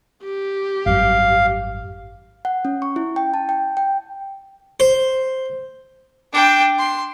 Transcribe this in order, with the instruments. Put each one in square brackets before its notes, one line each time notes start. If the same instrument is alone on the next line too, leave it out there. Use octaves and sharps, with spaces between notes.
[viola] G4
[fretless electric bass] G#1 F#2 G3 [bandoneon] F5
[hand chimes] F#5
C#4
C#6
E4
G5
A5
G5
G5
[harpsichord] C5
[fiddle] D4 G5
C6